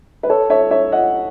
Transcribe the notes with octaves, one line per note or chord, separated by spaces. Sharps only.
B4
A4 C#5
C#5 E5
C#5 E5
D#5 F#5